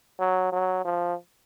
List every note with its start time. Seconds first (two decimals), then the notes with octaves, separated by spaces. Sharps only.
0.20 F#3
0.52 F#3
0.85 F3